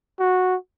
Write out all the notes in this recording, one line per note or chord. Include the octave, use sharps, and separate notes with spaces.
F#4